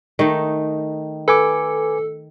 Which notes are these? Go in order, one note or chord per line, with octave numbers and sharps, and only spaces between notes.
D#3 A3 D#4
A4 B4 G#5 D6